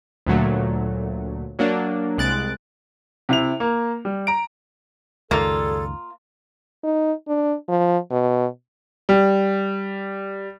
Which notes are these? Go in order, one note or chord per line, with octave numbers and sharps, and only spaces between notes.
D2 A#2 F#3 A3
F#3 A#3 D4
C2 G#3 F#6 A6 D7
C3 E4 F7
A#3
G3
A#5 D7
C#2 F#2 D#3 G3 A#3 F4 G#4 A4
D#4
D4
F3
B2
G3